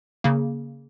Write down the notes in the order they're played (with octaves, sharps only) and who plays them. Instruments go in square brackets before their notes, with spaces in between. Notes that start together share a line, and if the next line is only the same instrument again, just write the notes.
[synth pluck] C#3 A#3